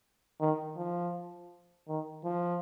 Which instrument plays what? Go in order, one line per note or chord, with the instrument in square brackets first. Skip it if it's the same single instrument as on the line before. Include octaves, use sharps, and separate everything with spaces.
[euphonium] D#3
F3
D#3
F3